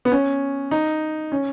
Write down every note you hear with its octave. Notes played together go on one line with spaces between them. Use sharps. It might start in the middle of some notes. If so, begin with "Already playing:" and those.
B3
C#4
D#4
C#4